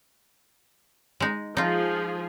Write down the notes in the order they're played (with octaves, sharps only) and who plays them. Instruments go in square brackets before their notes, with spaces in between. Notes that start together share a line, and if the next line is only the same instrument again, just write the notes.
[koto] G#3 D#4
[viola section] F3 G#4 [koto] D#4 F4